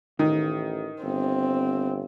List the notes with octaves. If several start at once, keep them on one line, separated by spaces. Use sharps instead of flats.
A1 D#3
G1 C4